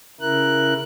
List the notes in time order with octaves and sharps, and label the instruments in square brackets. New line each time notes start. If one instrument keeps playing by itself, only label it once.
[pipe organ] C#3 E4 A#4 F#6